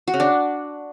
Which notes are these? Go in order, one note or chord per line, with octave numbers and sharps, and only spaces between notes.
F#4
C#3
D4